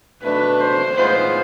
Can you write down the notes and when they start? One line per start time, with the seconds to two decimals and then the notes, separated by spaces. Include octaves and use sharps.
0.23 B2 A3 D4 B4
0.60 C5
0.97 A2 G#3 B3 F4 B4 C5